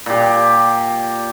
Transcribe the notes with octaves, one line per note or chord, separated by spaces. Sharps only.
A#2 G4